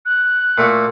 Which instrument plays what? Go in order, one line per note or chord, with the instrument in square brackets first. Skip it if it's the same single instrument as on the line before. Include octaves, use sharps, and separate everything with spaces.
[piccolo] F#6
[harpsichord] A#2 A3 F#4